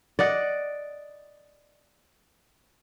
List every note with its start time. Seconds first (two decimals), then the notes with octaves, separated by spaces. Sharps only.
0.19 D5 D#5 F#5